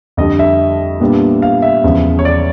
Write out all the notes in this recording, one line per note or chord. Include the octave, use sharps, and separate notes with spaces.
F2 D3 G3 D#5
E5
A#2 G3 B3 D4 F4
F5
E5
E2 C#3 F3 G#3
C#5
D5